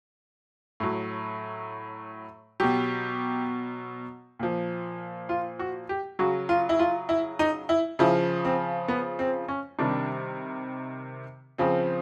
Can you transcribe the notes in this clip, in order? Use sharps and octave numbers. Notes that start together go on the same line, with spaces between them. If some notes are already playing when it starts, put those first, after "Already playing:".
A2 F#3
B2 F#3 G4
A#2 F3
F4
F#4
G4
C#3 F#3 F#4
F4
E4
F4
E4
D#4
E4
C#3 F3 E4
C4
B3
C4
C#4
C3 D#3 G3 D4
C#3 F3 C4